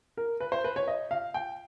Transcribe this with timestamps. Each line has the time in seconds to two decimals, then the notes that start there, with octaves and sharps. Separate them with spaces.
0.17 A#4
0.40 B4
0.52 C5
0.64 B4
0.76 C#5
0.88 D#5
1.11 F5
1.34 G5